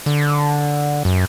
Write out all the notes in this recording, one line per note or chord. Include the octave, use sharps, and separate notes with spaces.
D3
F#2